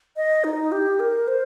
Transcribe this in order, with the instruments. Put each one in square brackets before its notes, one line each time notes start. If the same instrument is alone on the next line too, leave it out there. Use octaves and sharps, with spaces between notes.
[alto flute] D#5
D#4
G4
A#4
C5